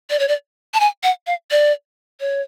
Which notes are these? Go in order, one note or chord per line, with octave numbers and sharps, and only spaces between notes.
D5
C#5
D5
A5
G#5
F#5
F5
D5
C#5